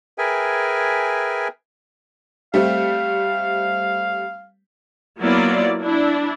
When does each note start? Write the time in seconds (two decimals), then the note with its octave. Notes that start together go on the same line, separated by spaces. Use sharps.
0.18 G#4 A#4 B4 E5 G5 G#5
2.54 G3 A3 C4 F5
5.20 F#3 A#3 B3 E4 F4 D5
5.82 D4 E4